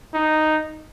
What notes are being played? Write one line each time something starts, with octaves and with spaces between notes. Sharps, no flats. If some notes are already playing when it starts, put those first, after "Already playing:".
D#4